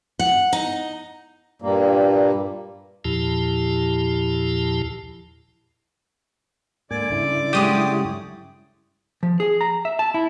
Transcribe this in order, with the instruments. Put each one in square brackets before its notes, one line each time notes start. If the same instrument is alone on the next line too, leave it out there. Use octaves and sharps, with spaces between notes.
[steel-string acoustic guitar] F#5
D#4
[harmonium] G2 A#2 G3 A#3
[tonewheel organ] E2 A#2 F3 E4 G4 A5
[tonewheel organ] G#2 A#3 G#5 [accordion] D3 D5 D6
[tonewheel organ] G2 C#3 E4
[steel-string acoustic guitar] F#3 G#3 A3 [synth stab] G4 D#6
[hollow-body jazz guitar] F3
G#4
A#5
E5
A5
E4